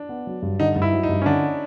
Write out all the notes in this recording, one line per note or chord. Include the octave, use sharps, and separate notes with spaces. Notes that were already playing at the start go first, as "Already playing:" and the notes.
Already playing: D4
B3
F#3
G2
D3 D#4
G2
E4
F#3
D#4
G2
C#4
D3 D4